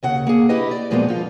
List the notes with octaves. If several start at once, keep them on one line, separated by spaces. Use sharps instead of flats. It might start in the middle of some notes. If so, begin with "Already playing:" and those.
D#2 C#3 F#5
A#3 G#4
E4 G4 B4 D#5
D5
F#2 A#2 F3 G#3 A#3 B3
F3 F4